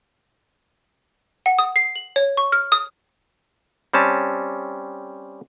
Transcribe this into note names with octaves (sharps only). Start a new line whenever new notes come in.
F#5
D#6
C7
F#7
C#5
C#6
F6
D#6
G3 C4 C#4 A5